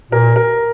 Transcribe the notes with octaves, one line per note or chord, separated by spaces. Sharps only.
A#2 A#4
A#4